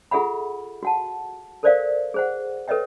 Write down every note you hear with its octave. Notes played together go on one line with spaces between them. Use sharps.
F4 G#4 A4 E5 F#5 B5
F#4 F#5 A5
A4 A#4 C5 D5 E5 F5
G#4 C5 F#5
A4 B4 C#5 D#5 E5 G5